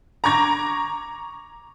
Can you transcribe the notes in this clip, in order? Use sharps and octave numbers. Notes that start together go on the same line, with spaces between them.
A#5 C#6 D6 G#6 A#6